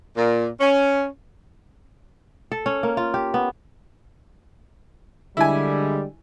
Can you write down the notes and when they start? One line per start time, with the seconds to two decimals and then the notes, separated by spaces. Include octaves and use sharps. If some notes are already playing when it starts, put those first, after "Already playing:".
0.16 A#2
0.60 C#4
2.52 A4
2.66 C#4
2.83 A#3
2.97 F4
3.14 G4
3.34 B3
5.37 D3 G3 G#3 E4 G#5